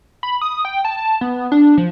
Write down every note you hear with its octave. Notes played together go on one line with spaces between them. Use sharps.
B5
D#6
G5
A5
B3
D4
F3